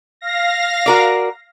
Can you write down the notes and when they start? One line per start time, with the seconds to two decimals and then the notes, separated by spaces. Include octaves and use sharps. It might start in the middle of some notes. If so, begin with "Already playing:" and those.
0.21 F5 A#6
0.86 F#4 A#4 D5